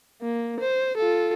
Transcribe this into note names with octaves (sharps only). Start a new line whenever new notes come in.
A#3
C5
F4 A4